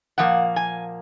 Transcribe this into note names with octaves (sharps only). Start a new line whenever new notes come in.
A#2 F3 A#3 F#5
G#5